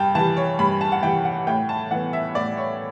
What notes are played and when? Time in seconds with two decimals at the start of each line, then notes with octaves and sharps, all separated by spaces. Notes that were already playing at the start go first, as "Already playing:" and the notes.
Already playing: G2 G5 A5
0.15 E3 G3 A5
0.37 C#5
0.59 G2 B5
0.81 A5
0.92 F#5
1.03 E3 G3 G5
1.25 F#5
1.47 A2 G5
1.69 A5
1.91 E3 B3 F#5
2.13 E5
2.35 A2 D5
2.57 C#5